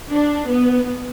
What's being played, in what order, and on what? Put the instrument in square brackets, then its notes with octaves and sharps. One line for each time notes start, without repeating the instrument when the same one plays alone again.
[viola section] D4
B3